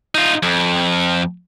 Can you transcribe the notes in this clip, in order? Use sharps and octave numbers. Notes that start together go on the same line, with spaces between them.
D#4 F4
F2